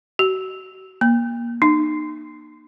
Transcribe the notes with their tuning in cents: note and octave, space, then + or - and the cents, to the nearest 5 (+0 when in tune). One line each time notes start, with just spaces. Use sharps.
F#4 +35
A#3 +25
D#4 -35